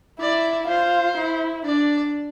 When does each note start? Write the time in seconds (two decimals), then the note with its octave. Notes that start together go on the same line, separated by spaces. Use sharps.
0.20 E4 D5
0.68 F4 C5
1.17 E4
1.65 D4 D5